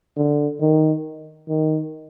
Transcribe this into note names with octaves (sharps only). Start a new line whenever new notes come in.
D3
D#3
D#3